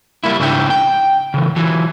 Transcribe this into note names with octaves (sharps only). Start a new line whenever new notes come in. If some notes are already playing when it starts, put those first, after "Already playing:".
G3 A#3 E4
G#2 C#3 D4 E4 A4 G5
G5
C#3 E3
E3 F#3